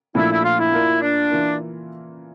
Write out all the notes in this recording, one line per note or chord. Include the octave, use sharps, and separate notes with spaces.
A#2 F3 A3 D4 E4
E4
F4
E4
A#3 F4 A#4 D5
D4
E3 A#3 F4 A#4